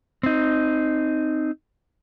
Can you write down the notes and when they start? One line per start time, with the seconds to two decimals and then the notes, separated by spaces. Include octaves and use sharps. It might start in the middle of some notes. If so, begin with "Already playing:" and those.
0.23 C4 D#4